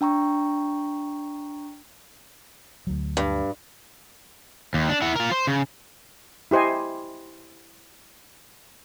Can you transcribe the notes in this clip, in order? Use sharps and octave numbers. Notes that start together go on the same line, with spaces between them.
D4 G5 A#5 C#6
D2 F#3
G2
D#2
D4
E4 F#5
F4 A#4
C5
C#3
E4 G4 C5 D#5 G#5